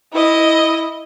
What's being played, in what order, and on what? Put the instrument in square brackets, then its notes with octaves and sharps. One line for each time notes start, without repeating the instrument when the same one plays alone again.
[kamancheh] E4 D#5